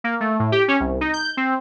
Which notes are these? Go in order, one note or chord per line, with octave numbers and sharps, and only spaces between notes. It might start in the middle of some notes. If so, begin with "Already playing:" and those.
A#3
A3
A2
G4
C#4
C2
D#4
G6
C4